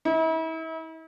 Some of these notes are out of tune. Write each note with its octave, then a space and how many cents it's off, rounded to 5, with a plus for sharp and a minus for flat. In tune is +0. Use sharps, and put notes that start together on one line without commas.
E4 -40